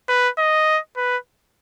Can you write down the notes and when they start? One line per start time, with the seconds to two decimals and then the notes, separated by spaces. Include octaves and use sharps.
0.08 B4
0.38 D#5
0.96 B4